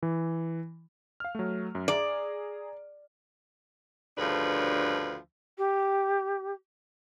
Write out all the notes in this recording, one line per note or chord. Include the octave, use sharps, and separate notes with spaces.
E3
F5 F6
F#3 A3
F#2
G#4 D5 A#5
D2 G2 C#3 F3 D4 B4
G4